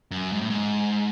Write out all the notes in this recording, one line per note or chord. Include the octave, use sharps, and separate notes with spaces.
F#2
G#2
A2
G#2